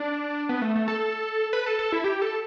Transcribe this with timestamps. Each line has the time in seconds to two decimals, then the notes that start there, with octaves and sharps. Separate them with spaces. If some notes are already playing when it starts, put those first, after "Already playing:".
Already playing: D4
0.49 B3
0.62 A3
0.75 A3
0.88 A4
1.53 B4
1.66 A4
1.79 A4
1.92 E4
2.04 G4
2.22 A4